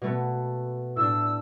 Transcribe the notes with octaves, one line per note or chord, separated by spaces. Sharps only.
B2 A3 B3
A2 D4 E6